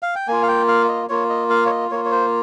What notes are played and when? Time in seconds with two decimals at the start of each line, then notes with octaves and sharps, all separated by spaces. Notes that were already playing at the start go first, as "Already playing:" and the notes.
0.03 F5
0.15 G5
0.28 A#3 F4 G#5
0.42 F5
0.48 G5
0.68 F5
0.88 D#5
1.09 A#3 F4 C#5
1.30 D#5
1.50 F5
1.66 C#5
1.70 D#5
1.91 A#3 F4 C#5
2.05 C#5
2.11 C5